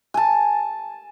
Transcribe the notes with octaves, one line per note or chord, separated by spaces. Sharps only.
G#5 A5